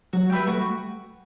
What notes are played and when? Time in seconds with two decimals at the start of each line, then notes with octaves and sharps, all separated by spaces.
0.13 F#3 F#4
0.30 G3 B4 E5 G5
0.47 A3 F#4